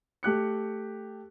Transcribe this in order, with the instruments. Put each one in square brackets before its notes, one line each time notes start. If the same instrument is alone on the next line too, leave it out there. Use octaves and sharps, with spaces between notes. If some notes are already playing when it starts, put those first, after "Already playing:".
[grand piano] A3 G4 F#6 C#7